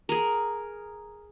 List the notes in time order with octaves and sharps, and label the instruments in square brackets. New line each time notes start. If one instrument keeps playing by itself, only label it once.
[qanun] G#4 A#4